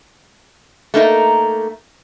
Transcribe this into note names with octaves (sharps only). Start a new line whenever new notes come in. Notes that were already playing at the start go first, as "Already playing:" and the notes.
A3 A#3 D#4 A#4